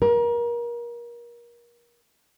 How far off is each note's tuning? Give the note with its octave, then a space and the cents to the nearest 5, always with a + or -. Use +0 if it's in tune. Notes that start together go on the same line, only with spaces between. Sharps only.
A#4 +30